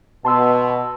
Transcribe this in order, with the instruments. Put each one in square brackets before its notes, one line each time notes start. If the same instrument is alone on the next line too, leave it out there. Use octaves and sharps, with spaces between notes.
[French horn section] B2 [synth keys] A5 C6 E6